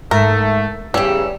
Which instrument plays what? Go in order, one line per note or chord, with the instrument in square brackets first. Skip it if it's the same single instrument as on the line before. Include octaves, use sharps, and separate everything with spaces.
[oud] G#2 [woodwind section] A3 [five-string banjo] A#4
[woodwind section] E2 C#3 E6 [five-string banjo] G3 [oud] G4 G#4